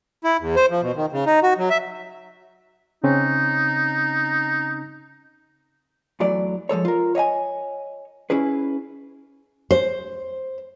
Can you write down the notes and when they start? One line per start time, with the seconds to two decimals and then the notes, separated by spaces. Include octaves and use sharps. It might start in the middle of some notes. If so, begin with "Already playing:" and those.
0.24 E4
0.40 E2
0.56 C5
0.70 F3
0.82 B2
0.96 D#3
1.12 C#3
1.26 D#4
1.43 F#4
1.58 F#3
1.70 E5
3.04 C#3 C4 C#4 D#4
6.20 E2 E3 F#3 A3 D5
6.69 F3 G#3 A4 C#5
6.85 F4 A#4
7.15 C#5 D#5 F5 G#5
8.30 C#4 E4 G#4 B4
9.71 C5